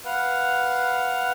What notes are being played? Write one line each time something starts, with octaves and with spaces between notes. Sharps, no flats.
B4 F5 F#5